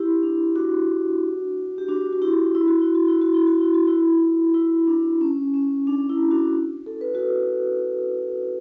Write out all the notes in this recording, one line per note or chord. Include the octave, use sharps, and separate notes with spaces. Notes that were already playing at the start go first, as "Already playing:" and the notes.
Already playing: E4 G4
D4
D4 F#4
G4
D4 F#4
F#4
E4 G4
E4
F#4
E4
F#4
E4
F#4
E4
F#4
E4
F#4
E4
E4
D4
C#4
C#4
D4
E4
D4 F#4
A4
B4
F#4 A4